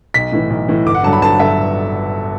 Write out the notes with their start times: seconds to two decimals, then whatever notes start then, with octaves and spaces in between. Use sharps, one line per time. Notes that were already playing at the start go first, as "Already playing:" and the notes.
0.14 B1 B6
0.32 A2 E3
0.50 B1
0.68 A2 E3
0.86 G1 D6
0.95 F#5
1.03 G2 D3 F#3 A5
1.13 B5
1.21 G1 A5
1.39 G2 D3 F#3 E5